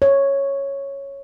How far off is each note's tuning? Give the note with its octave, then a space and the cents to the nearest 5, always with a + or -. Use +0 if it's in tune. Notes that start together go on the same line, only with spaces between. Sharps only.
C#5 -5